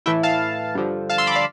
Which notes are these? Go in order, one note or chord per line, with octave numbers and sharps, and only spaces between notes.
A2 E3 A3 E4 E5 G5
F5 A5
G2 D3 F3
F5 A5
C6 E6
B5 D6
D5 F5